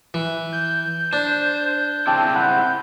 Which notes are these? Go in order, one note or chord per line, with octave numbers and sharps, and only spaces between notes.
E3
G6
D4 C5
C#3 C4 E4 G5 A5 D6
F#5 B5 F#6